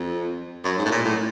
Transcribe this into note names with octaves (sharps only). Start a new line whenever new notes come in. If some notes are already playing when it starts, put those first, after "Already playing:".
Already playing: F2
F#2
G#2
A2
A#2
A2